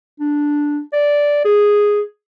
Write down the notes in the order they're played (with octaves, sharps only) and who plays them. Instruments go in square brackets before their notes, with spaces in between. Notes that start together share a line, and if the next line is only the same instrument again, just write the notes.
[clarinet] D4
D5
G#4